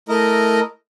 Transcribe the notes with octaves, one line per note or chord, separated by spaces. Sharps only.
A3 E4 A#4 D#5